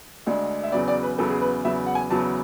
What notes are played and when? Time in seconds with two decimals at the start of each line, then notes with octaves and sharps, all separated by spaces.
0.26 D2 D3 G#3 D4
0.64 E5
0.72 E2 C#3 F#3 B3 D5
0.88 D5
1.03 B4
1.18 E2 C#3 F#3 B3 A4
1.30 G#4
1.41 B4
1.65 E2 C#3 F#3 B3 E5
1.87 F#5
1.95 G#5
2.10 E2 C#3 F#3 B3 A5